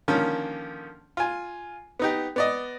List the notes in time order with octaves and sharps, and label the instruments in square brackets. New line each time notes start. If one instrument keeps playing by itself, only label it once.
[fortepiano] D3 D#3 F3 A#3 C#4
F4 G#5
B3 D#4 G4
B3 D5 D#5